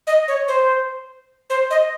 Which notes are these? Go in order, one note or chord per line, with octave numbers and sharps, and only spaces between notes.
D#5
C#5
C5
C5
D#5